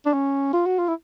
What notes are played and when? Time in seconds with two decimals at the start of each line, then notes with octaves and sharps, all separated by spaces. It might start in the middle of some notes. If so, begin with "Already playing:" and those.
0.06 D4
0.13 C#4
0.53 F4
0.66 F#4
0.79 F4
0.89 E4